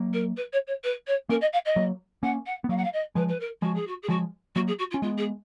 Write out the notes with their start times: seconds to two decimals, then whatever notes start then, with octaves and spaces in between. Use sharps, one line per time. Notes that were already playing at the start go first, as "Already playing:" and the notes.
Already playing: F#3 A#3
0.13 A#4
0.36 B4
0.52 C#5
0.67 C#5
0.84 B4
1.07 C#5
1.29 A#3 C#4 A#4
1.41 D#5
1.53 F5
1.65 D#5
1.76 F#3 A#3
2.23 A#3 C#4 F#5
2.46 F#5
2.64 B3
2.69 F#3 A#3 F5
2.77 F#5
2.84 F5
2.93 D#5
3.15 F3 G#3 B4
3.28 B4
3.40 A#4
3.62 F3 G#3 F#4
3.75 G#4
3.87 F#4
4.02 G#4
4.08 F3 G#3 F#4
4.55 F#3 A#3 F#4
4.67 G#4
4.79 F#4
4.90 F4
4.94 C#4
5.02 G#3 B3 F4
5.18 G#4